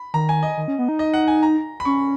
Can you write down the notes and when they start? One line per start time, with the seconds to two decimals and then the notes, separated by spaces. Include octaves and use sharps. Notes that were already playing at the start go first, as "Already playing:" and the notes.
Already playing: B5
0.14 D#3 A#5
0.29 G#5
0.43 D#5
0.57 D#3
0.68 C#4
0.79 B3
0.89 D#4
0.99 D#5
1.14 F#5
1.28 G#5
1.43 A#5
1.80 B5
1.85 C#4 C#6